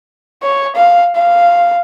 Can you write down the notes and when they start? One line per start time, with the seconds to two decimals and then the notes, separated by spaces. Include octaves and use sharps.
0.43 C#5
0.75 F5
1.15 F5